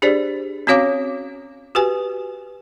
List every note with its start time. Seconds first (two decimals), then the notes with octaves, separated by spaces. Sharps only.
0.02 D4 G4 G#4 C5 D5
0.67 C4 C#4 F#4 C#5 F5 D6
1.75 F#4 G4 B4 G#5